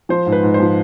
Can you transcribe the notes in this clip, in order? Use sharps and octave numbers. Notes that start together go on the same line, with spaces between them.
F3 C5
G#2
B4
G#2
C5
F3